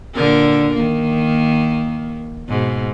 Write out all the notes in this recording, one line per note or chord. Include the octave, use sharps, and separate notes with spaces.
A#2 D3 A#4
D#3 A#3
G#2 B2